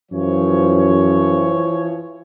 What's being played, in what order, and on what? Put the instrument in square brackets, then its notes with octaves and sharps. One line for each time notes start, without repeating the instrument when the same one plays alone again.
[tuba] F#2 [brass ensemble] E3 F3 C#5